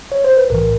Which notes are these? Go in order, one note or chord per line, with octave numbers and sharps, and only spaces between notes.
C#5
C5
B4
B1 A2 E3 A#4